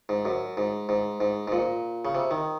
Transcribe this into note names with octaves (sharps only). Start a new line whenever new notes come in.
G#2
F#2
G#2
G#2
G#2
G#2
A#2
C#3
C3
D#3